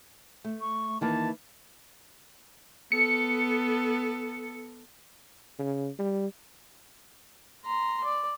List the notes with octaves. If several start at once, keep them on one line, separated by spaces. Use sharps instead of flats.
A3
C#6
D#3 E3 A#3 A5
B3 A4 C#7
C#3
G3
A#5 C6
D5